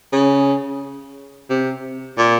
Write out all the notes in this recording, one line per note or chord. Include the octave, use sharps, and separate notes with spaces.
C#3
C3
A#2